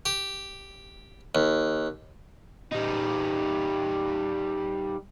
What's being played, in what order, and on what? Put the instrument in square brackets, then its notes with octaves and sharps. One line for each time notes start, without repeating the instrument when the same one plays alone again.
[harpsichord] G4
D#2
[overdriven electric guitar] G3 D#4